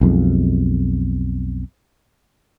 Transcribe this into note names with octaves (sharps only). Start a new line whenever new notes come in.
B1 F2 G#3